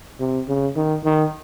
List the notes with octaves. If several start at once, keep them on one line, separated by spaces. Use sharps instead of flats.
C3
C#3
D#3
D#3